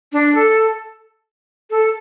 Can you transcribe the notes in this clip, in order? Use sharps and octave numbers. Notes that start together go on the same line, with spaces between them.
D4
A4
A4